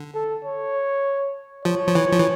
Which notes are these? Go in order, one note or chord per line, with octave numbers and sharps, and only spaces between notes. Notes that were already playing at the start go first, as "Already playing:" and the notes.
Already playing: D3
A4
C#5
F3 C#5
F3
E3
F3
E3